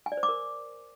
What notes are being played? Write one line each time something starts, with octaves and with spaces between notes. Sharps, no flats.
G#5
D5
C5
D6
A#4